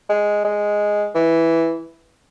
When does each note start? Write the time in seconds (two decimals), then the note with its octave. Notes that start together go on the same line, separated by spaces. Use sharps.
0.09 G#3
0.45 G#3
1.15 E3